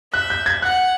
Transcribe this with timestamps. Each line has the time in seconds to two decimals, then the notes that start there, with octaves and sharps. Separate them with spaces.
0.12 E5 F#6
0.30 G6
0.46 G#6
0.62 F#5 F#6